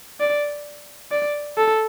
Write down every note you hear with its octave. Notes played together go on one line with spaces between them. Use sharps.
D5
D5
A4